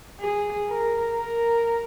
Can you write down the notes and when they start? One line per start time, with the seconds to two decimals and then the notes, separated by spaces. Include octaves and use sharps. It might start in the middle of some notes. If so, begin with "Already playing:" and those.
0.20 G#4
0.69 A#4
1.17 A#4